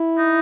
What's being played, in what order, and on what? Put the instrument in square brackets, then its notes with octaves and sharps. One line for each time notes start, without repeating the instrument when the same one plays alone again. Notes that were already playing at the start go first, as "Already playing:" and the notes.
Already playing: [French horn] E4
[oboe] D#4